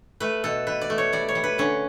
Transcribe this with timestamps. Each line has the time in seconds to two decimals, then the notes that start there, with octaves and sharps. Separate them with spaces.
0.20 A3 B4
0.44 B2 A4
0.67 B2 B4
0.82 D5
0.90 A3
0.98 C#5
1.13 G3 D5
1.29 C#5
1.35 G3
1.44 B4
1.58 D3 C#4